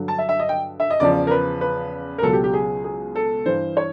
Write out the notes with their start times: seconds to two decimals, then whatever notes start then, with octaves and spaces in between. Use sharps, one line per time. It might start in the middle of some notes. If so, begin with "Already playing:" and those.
Already playing: G2 D3 F#3
0.08 A5
0.18 E5
0.29 E5
0.39 D#5
0.49 G5
0.80 E5
0.90 D#5
1.00 E2 C#3 F3 D5
1.27 A#4
1.31 B4
1.61 B4
2.18 A#4
2.23 C#2 B2 F#3 A4
2.33 G4
2.44 G4
2.54 G#4
2.84 G#4
3.15 A4
3.46 G2 E3 C5
3.77 C#5